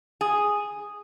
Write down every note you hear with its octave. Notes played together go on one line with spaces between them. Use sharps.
G#4